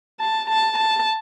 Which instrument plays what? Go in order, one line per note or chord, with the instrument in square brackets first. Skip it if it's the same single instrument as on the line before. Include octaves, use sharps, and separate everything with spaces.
[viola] A5
A5
A5